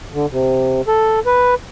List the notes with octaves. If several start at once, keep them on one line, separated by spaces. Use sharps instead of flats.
D3
C3
A4
B4